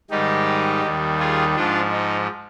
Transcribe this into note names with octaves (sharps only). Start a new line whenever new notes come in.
G#2 D#3 G3 D#4 G4
D#2 D#3 G3
F4 G#4
G#2 F3 D4 F4
D#4